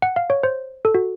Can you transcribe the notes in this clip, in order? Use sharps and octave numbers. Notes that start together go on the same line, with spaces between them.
F#5
F5
C#5
C5
A4
F#4